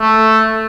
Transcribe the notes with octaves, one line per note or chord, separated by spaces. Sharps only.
A3